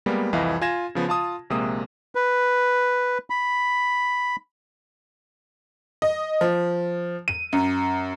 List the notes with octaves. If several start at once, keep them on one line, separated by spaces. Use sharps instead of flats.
G3 G#3 A#3 B3
C2 F2 E3 D#5 F5
F4 G#5 G#6 A#6 E7
C#3 F3 B3
F4 A5 D#6
A#1 C3 G#3 A#3 D#6
B4
B5
D#5
F3
D#7
F#2